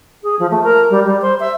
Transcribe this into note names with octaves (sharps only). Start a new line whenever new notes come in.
G#4
F3
A3
A#4
G3
G3
C5
E5